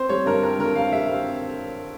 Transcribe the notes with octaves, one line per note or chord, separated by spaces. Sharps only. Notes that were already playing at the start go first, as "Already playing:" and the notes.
Already playing: C4 C5
G3 C#5
G2 A#4
C4 A#4
G2 A#4
G3 F5
G3 E5
C4 F5